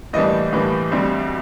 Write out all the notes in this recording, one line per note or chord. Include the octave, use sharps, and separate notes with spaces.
A2 E3 G3 A#3 D4 D#5
A2 E3 G3 A#3 D4
D2 D3 G3 C4